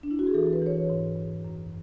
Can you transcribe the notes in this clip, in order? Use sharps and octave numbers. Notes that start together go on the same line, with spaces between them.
D4
E4
F#4
G#4
E3 A4
B4
E3 C#5
B4
G#2
G#2
F#2